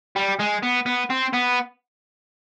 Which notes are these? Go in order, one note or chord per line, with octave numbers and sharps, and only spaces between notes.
G3
G#3
B3
B3
C4
B3